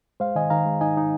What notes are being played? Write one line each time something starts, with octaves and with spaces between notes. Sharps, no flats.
G#3 C5 F5
D#3 D#5 G#5
D#3 F5 A#5
G#3
D#4 D#5 G#5
D#4